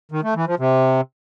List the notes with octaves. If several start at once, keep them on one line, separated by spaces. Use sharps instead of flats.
D#3
A3
E3
F3
C3